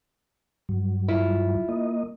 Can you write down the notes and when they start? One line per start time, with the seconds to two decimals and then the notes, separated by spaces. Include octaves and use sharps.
0.69 G2 F#3
1.08 E4 F4
1.69 A#3 D#5